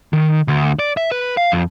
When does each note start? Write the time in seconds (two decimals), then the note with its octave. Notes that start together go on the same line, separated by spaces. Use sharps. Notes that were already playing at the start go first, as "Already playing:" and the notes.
0.13 D#3
0.48 D2
0.79 D5
0.97 E5
1.11 B4
1.37 F5
1.52 F2